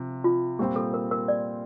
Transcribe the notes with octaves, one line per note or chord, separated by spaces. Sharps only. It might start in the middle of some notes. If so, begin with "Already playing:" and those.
Already playing: C3 F3
F4
A#2 G3 C4 G4
A4
A#4
A#4
D5